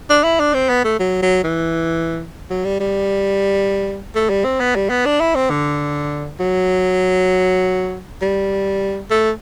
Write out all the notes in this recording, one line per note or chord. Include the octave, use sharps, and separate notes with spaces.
D4
E4
D4
C4
B3
A3
F#3
F#3
E3
F#3
G3
G3
A3
G3
C4
B3
G3
B3
D4
E4
C4
D3
F#3
G3
A3